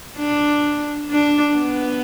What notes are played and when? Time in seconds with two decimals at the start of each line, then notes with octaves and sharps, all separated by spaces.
0.17 D4
1.10 D4
1.57 B3